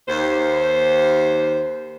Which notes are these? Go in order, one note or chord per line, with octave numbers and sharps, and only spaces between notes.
D#2 C5